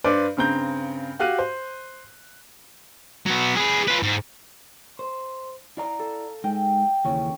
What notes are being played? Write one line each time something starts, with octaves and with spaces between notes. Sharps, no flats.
G2 B4 C5 D5 D6
G2 C#3 C4 A#5 G6
F#4 G4 F5 F#6 D#7
C5
F#3 B3
G#4 B4
F4 B4
G#2
C5
E4 D5 F5 A#5 D6
A4
G#3 D#4 G5
D#2 C#3 E3 C#4